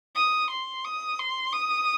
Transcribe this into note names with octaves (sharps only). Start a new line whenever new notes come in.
D#6
C6
D#6
C6
D#6